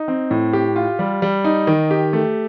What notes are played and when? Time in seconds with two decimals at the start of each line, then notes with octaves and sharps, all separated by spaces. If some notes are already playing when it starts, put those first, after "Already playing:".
Already playing: D#4
0.08 C4
0.31 A2
0.53 G4
0.76 F4
0.99 G3
1.22 G3
1.44 D#4
1.67 D#3
1.91 G4
2.13 A3